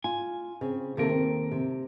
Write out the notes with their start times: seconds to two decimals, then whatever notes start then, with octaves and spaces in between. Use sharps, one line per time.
0.04 F4 G#5
0.61 C#3 C4
0.97 D#2 C3 A#3 A4 A#4
1.09 C4
1.52 C3